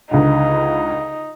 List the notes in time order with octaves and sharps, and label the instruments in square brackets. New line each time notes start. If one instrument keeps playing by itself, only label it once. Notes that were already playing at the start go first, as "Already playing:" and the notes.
[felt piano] C#2 D3 [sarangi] D#4